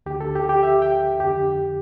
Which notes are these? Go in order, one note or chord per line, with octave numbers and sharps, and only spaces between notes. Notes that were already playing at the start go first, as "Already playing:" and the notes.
D2 D3 G4
A4
G4
G4
E5
G5
F2 D3 G4